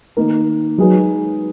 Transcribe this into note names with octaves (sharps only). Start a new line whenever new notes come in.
D#3 A#3 D#4 A#4
F#3 G#3 D#4 G#4 B4